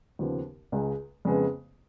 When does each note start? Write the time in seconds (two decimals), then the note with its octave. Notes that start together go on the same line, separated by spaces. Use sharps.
0.19 D#2 C#3 F3 B3
0.72 C#2 C#3 G#3
1.25 F2 C#3 G#3 B3